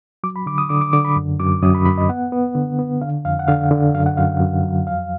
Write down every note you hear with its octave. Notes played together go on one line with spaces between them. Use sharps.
F#3 D6
B5
D3 D6
D#6
D3 D6
D6
D3 D6
B5
F#2
F#2 D6
F#2 D#6
B5
F#2 B5
D#5
B3 F#5
B3
D3
B3
D3 F5
F2 F5
F#5
D3 F5
D3
F#2 F5
F#5
F#2 F5
F#2
F#3
F2 F5